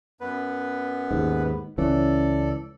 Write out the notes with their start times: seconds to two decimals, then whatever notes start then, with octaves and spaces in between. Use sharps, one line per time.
0.21 F#2 B3 B4
1.11 D#2 G#2
1.78 C#2 E3 C#4 A4 D5